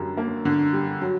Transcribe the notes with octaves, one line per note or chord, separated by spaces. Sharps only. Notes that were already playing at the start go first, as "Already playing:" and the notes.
Already playing: F#2 D3 G3
A#3
D3
G3
F#3